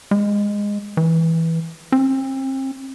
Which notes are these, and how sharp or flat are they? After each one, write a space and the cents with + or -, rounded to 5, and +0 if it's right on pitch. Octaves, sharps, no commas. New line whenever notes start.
G#3 -15
E3 -10
C4 +35